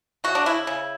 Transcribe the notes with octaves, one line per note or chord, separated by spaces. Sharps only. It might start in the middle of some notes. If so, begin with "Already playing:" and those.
C#3 F#4
D4
C#3 E4
C#3